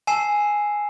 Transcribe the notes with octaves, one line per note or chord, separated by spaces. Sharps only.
G#5 A5 E6 C7 E7